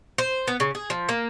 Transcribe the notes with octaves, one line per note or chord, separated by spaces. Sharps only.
C5
B3
C#3
G#4
F3
A#3